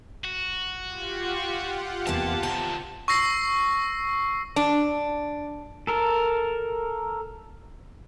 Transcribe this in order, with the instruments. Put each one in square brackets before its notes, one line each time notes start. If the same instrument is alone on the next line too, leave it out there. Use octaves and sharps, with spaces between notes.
[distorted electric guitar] F#4
[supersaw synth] F4 G4 F#5
[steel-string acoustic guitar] E2 C3 A#3 [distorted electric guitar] A5
[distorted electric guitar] C3 D#3 [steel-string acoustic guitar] A5
[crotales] C#6 E6 A#6 C7
[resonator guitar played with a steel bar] D4
[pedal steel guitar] A4 A#4